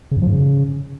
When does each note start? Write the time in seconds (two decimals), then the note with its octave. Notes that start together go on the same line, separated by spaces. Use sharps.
0.11 C#3
0.17 F#2
0.22 F3
0.27 G#2
0.32 C#3